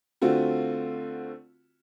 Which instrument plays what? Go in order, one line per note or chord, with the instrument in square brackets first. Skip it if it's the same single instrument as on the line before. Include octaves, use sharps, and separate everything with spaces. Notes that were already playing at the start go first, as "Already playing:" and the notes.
[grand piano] D3 A3 C4 F4 F#4